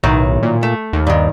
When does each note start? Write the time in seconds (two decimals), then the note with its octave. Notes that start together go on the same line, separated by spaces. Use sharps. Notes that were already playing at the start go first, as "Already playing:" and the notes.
0.03 B1 A2 D#3 F#3
0.43 A#2
0.63 A3
0.93 D#2
1.07 G2 D#3